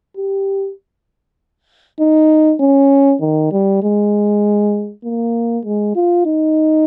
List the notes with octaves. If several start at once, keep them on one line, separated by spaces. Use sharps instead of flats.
G4
D#4
C#4
D#3
G3
G#3
A#3
G#3
F4
D#4